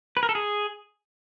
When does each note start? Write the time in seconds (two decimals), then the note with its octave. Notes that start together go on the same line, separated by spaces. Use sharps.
0.17 B4
0.23 A#4
0.29 A4
0.35 G#4